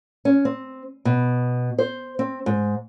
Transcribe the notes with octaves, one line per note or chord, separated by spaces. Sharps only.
C#4
C4
B2
C5
C4
G#2